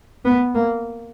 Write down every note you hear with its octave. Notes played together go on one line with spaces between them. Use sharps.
B3
A#3